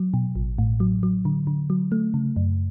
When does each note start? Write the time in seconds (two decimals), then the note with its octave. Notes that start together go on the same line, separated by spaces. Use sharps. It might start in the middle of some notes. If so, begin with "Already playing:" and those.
Already playing: F#3
0.14 B2
0.36 A1
0.58 A2
0.80 F#3
1.03 F#3
1.25 D3
1.47 D3
1.70 F#3
1.92 A3
2.14 C#3
2.36 F#2